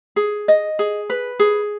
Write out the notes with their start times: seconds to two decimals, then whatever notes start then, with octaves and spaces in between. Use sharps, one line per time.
0.16 G#4
0.48 D#5
0.79 G#4
1.10 B4
1.39 G#4